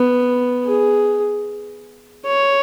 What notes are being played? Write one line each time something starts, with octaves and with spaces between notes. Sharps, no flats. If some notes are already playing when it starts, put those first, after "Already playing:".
Already playing: B3
G#4
C#5